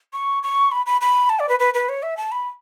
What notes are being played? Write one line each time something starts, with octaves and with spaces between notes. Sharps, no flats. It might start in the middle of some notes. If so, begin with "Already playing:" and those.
C#6
C#6
B5
B5
B5
A5
D5
B4
B4
B4
C#5
E5
A5
B5